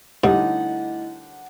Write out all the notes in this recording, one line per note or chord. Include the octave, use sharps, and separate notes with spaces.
G2 D3 G3 A3 D#4 E4 D#5 F#5